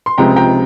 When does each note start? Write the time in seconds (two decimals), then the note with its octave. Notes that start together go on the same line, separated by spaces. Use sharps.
0.06 C6
0.18 C#2 C3 F3 G#3 G5 A#5
0.36 G5 A#5